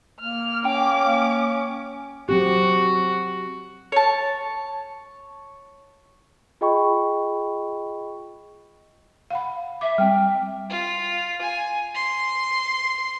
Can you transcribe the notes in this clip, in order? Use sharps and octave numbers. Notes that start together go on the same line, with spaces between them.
A#3 F6
C#4 G5 D6
F#3 C4 F#4 G4
C#5 A5
F4 G#4 D#5 G5 B5 C#6
F5 F#5 B5
E5 D6
G3 C4 G5
F4
G#5
C6